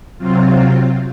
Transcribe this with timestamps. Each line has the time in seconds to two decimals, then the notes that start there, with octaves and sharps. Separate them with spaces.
0.18 C3 F#3 C4 F4